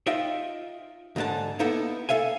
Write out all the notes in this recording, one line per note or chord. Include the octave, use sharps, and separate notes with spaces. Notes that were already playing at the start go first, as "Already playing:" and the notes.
D#4 F4 D#5 E5 G5
C#2 G#2 D3 G#3 A5
A#3 B3 D#4 E4 A4
A4 E5 F5 G#5